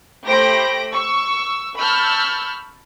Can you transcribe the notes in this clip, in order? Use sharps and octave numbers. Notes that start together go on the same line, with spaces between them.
A3 G4 C5 B5 A#6 D7
C#6 E6
A5 B5 C#6 E6 F6 G6